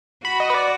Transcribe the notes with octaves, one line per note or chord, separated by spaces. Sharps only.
F#4 B5
D#5
B4
D5